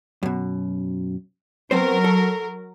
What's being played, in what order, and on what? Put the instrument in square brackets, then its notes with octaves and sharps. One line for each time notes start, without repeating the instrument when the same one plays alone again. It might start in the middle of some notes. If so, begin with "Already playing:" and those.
[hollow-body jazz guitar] F#2 B2
[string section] F#3 A#4 [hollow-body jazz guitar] B3 C4 C5
[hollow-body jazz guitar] A4